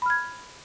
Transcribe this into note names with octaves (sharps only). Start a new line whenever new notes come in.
B5 F6 G#6